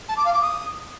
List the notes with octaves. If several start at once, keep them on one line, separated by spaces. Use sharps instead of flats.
A5
D6
F5
D6
D#6